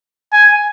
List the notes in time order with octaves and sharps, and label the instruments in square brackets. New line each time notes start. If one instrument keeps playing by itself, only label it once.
[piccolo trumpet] G#5